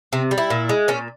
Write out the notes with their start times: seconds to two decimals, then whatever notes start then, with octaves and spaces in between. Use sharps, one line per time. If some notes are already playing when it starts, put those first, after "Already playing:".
0.13 C3 C4
0.31 G3
0.38 E4
0.50 A#2
0.69 G#3
0.88 A#2 C#4